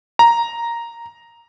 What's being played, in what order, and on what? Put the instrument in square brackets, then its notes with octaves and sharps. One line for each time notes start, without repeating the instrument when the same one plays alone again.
[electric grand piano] A#5